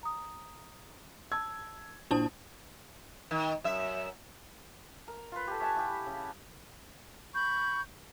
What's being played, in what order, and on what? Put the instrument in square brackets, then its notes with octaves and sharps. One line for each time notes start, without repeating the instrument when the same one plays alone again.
[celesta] A#5 D#6
[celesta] A5 E6 [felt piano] G#6
[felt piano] A#1 C5 D#6 [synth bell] D4 E4 A5
[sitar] D#3
F#2 E5
[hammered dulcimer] A#4
F4 B4
G4 A4
C#5 E5 G#5 A5
E4 G4
C#3
[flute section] B5 C#6 G6